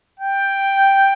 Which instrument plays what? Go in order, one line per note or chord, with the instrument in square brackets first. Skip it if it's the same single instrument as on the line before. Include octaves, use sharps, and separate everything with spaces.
[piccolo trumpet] G5